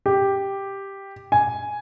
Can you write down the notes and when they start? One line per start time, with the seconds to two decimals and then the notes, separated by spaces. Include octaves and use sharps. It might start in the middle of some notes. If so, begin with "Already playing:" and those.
0.06 G4
1.32 G#5